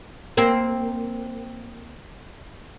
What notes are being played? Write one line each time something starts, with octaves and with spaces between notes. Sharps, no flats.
A#3 C4